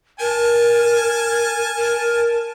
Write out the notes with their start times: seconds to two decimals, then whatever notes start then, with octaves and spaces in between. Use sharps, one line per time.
0.20 A#4 G#5 A5
1.77 A#4